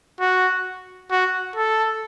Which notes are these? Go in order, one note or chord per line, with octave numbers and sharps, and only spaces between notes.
F#4
F#4
A4